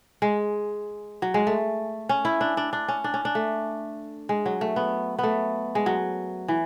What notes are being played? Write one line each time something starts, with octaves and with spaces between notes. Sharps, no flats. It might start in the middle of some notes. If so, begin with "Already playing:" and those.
G#3
F#3
G#3
A3
C#4
E4
D4
D4
D4
C#4
D4
C#4
D4
A3
G#3
F#3
A3
B3
A3 B3
G#3
F#3
E3